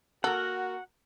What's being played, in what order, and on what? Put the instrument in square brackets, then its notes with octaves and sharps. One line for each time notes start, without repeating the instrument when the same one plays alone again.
[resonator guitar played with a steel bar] A#3 A#4 [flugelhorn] F#4 [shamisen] A4 [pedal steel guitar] F#5